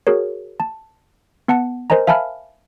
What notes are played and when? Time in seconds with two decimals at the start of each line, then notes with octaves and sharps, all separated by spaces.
0.07 F#4 G#4 A#4 C#5
0.60 A5
1.48 B3 F#5 A5 C#7
1.90 A#4 C5 D#5 G#5 A#5
2.07 E5 F5 G#5 A5 B5 F6